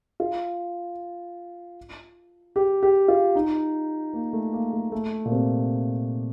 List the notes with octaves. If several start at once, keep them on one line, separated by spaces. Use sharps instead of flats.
F4
G4
G4
F4
D#4
A#3
A3
A#3
A3
A3
A#2
C3